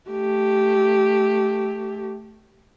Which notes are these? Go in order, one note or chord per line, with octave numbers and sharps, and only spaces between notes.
A3 G4